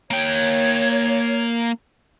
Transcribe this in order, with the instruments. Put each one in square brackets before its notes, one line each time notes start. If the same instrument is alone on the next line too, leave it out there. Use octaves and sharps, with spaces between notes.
[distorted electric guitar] A#3 G5 [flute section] C#5 G#6